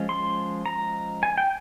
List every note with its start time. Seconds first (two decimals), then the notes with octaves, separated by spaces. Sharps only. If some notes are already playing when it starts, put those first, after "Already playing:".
Already playing: F3 G#3 C#4
0.09 C6
0.66 A#5
1.23 G#5
1.38 G5